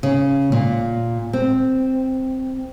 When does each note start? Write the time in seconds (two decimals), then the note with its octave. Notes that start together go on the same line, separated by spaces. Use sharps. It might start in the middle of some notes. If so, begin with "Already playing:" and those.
0.03 C#3
0.52 A#2
1.33 C4